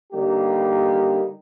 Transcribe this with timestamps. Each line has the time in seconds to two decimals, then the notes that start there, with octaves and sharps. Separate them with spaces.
0.12 D3 G3 A#3 D#4 G4